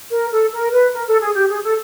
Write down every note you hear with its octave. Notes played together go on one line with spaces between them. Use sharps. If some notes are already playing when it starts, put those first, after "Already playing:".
A#4
A4
A#4
B4
A#4
A4
G#4
G4
G#4
A4